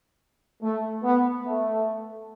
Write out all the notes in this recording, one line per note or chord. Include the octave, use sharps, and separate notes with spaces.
A3
B3
A3